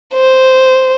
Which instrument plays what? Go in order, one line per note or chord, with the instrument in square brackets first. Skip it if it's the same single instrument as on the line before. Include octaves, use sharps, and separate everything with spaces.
[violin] C5